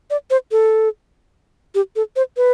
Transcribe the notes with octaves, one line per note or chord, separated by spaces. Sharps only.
D5
C5
A4
G4
A4
C5
B4